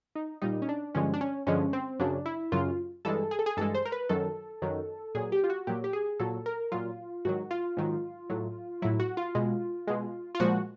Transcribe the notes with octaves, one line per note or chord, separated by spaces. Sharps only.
D#4
A#2 G3 D#4
C#4
D4
G2 D3 F3 G#3 C#4
D4
C#4
G2 D3 F3 G#3 C#4
C4
F#2 C#3 F#3 D4
E4
F#2 C#3 F#3 F4
G2 E3 G#3 A4
G#4
A4
G#4
G2 E3 G#3 A4
C5
A#4
B4
F#2 D#3 F#3 A4
F#2 D#3 F#3
A#2 F#3 G#4
G4
F4
F#4
A#2 F#3 G4
G4
G#4
A#2 F#3 A4
A#4
A#2 F#3 F4
G#2 D#3 F#3 F#4
F4
G#2 D#3 F#3
A2 F#3
A2 F#3 E4
F#4
F4
B2 G#3
B2 G#3
F4
A#2 F3 G#3 F#4